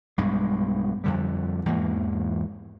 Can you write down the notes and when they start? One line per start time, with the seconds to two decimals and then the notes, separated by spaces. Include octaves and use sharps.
0.18 B1 G2 G#3
1.04 F2 D3 G3
1.66 E2 G#2 E3 A#3